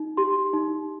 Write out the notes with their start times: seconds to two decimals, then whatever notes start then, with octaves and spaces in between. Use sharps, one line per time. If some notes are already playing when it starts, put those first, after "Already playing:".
Already playing: D#4
0.17 G4 C6
0.53 D#4